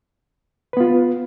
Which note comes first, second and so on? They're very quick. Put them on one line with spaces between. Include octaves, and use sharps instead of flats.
B4 B3 F4